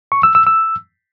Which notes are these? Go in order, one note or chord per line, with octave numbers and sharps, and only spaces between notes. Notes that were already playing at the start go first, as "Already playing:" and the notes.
C#6
E6
E6
E6